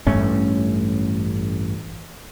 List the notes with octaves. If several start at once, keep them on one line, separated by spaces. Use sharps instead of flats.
A1 G2 A3 C#4